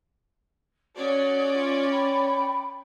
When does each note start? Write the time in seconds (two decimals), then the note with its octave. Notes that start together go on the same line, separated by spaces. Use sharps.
0.96 C#4 F#4 G#4 C#5 D5
1.52 F4
1.91 G5 B5